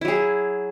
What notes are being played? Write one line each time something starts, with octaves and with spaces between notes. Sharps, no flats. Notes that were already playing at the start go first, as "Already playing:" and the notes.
F#3 E4 G#4